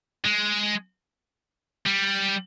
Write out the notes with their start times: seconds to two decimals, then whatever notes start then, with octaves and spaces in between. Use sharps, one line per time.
0.25 G#3
1.86 G3